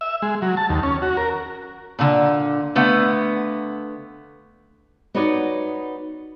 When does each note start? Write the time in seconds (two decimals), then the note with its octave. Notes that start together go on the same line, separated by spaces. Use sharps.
0.01 E5
0.22 G#3
0.42 F#3
0.57 A5
0.69 D#2
0.83 C#4
1.02 F#4
1.17 A#4
1.99 A#2 D3
2.75 D3 A3 B3 F5
5.14 B3 D#4 F#4 B4 C#5 D5